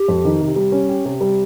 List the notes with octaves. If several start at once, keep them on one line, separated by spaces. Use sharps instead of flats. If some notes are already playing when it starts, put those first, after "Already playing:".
Already playing: G4
F2
D#3
C3
G3
C#4
G4
C3
G3